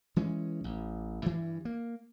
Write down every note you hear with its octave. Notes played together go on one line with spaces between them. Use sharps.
E3 G#3 C#4
A1
G2 E3
A#3